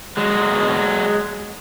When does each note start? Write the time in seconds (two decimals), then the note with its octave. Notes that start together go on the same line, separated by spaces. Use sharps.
0.17 F#3 G#3
0.34 F#3
0.52 B2
0.68 F#3